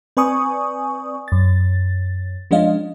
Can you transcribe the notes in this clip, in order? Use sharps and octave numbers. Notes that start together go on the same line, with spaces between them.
C4 B4 D5 G#5 C#6 D#6
F#2 A6
F3 G#3 C#4 D4 D#5 F5